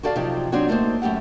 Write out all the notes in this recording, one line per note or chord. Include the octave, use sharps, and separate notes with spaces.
F#4 G4 A4 D5 F5
C3 F3 F#3 C4 D#4 G4
F#3 C4 D4 D#4 F#4 C#5
A3 A#3 D#4 C5
F#2 A3 G4 F#5